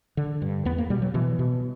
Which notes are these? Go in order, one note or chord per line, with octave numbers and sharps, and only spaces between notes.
D3
G2
E2 B3
A#3
B2 G3
F#3
B2 E3
B2